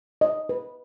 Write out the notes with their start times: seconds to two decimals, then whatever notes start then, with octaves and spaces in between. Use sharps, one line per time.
0.21 D#5
0.49 B4